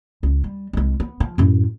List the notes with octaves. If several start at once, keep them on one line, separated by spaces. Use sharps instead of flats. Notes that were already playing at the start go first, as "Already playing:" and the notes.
C#2
G3
C2 G#3
B3
F3
F#2 A2